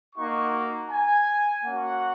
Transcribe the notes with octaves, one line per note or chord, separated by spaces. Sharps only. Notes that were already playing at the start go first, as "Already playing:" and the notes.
A#3 D#4 F#4 C#6
A#5
G#5
A#3 C#4 F#4 F#5